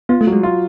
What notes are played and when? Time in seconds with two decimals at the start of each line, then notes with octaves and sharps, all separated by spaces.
0.09 B3 F4
0.21 A3
0.27 F#3
0.32 G#3
0.43 F4